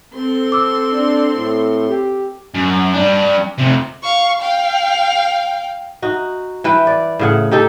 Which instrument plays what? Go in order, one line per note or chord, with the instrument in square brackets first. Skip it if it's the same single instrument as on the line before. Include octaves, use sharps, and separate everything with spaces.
[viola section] C4 A4 C6
[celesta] D6 E6
[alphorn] D4
A2
G4
[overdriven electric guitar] F#2
G3 D4
F2 C3
[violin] F5 C#6
F5 G5
[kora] D#4 F#4
E3 B4 G5
D5
A2 C#3 F#5
D#4 G4 A4